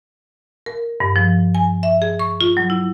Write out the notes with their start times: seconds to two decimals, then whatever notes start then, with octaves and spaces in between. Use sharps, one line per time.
0.66 A#4
1.00 G2
1.16 F3
1.55 G#5
1.83 E5
2.02 G#4
2.19 C#6
2.41 F4
2.57 F#3
2.70 E4